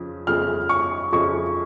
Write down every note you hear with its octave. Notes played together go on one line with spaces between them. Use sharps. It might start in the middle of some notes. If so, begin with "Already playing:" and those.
Already playing: F2 C#3 F3
F2 C#3 F3 F6
C#6
F2 C#3 F3 C#6